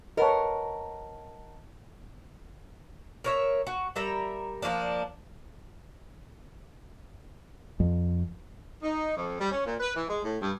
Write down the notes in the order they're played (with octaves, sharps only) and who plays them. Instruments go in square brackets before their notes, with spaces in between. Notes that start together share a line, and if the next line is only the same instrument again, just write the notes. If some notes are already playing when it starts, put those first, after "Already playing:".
[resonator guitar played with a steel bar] A#4 [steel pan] B4 C#5 [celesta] D#5 F#5 A5
[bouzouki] A#4 C#5 E5
F#4
G3 A#4 E5 A#5
F3 G3 A#3 D4
[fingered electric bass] F2
[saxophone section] D#4
F2
G3
C#4
A#2
B4
E3
G#3
A2
G2